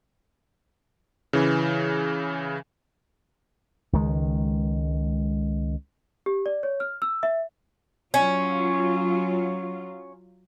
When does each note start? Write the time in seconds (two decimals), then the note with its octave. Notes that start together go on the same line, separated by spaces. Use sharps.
1.33 C#3 E3
3.93 C#2 D#3 G#3
6.26 G4
6.46 D5
6.63 C#5
6.80 F6
7.02 E6
7.23 E5
8.14 F#3 C#4 F4